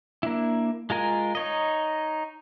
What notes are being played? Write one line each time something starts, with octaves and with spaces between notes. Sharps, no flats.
A#3 D4 E4
G#3 F4 A#4 G#5
D#4 C#5 D#5